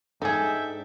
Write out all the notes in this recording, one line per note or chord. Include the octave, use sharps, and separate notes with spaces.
G#2 D4 D#4 G#4 A4 E5 G5